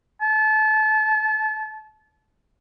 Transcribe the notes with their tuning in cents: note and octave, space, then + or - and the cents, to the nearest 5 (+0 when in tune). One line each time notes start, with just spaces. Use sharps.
A5 -30